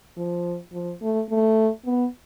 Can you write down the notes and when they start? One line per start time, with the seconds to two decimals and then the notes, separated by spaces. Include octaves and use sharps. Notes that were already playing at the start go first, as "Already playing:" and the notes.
0.17 F3
0.73 F3
1.02 A3
1.30 A3
1.86 B3